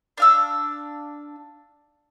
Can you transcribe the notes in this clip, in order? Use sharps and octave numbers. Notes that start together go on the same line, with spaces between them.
D4 F5 E6